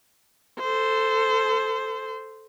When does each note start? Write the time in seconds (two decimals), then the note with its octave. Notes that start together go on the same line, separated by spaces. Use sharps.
0.59 A4 C5